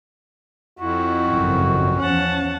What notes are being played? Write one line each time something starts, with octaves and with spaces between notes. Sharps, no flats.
F2 E4 F#4
G#1 F#2 C#3
E2 F3 C#4 F#5 A5